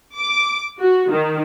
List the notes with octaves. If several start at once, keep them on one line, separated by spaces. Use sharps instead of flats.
D6
F#4
D#3